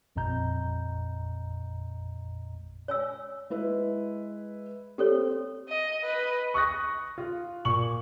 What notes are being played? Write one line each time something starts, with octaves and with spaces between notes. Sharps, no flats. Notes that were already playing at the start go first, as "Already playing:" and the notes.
A1 F2 A#2 D#5 A#5 G6
C#5 G#5 E6
G#3 E4 B4
C4 G4 A4 C#5
D#5
B4 D#5
C#6 D#6 F#6 A#6
F4
A#2 C#6 F#7